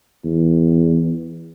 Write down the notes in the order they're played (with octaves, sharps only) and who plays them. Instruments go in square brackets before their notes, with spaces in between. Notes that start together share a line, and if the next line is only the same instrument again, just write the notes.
[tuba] E2